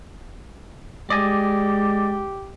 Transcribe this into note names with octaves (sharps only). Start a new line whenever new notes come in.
G#3 G4 D5 D#5 G#5